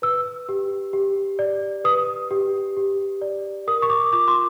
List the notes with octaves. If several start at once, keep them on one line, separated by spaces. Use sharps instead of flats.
B4 E6
G4
G4
D5
B4 D#6
G4
G4
D5
A#4 D#6
C#6
D6
F4 D6
C6